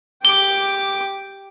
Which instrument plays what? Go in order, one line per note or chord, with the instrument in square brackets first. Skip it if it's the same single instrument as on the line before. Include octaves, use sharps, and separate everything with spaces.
[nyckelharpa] G4 D6 [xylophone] G7